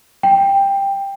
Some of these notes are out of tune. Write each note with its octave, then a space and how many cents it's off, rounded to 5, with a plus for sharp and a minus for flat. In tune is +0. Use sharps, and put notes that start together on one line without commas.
G5 +10